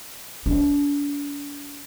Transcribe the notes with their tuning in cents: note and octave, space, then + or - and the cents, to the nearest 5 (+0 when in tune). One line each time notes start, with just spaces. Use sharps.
D4 -40